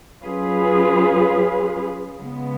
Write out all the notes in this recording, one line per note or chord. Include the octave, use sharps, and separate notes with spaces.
F#3 C#4 F4 G#4 B4
C#3 G#3 B3